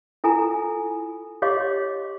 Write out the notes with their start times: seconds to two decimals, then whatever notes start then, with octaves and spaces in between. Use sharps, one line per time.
0.24 E4 F4 A4 G#5 A#5
1.42 G4 C#5 D#5 F5 C6 D6